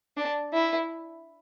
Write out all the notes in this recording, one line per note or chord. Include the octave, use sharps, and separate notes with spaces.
D4
E4